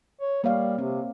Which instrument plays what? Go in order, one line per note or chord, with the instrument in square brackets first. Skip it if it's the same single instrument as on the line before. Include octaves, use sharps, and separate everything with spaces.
[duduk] C#5
[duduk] G3 [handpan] A#3 C#5 F5
[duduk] C3 [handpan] C4